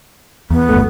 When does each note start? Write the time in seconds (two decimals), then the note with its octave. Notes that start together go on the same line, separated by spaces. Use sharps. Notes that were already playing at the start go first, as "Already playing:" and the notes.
0.50 E2 B3
0.69 G1 D2 A3